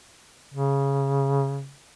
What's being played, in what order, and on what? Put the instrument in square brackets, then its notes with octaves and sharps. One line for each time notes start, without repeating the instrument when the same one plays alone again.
[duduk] C#3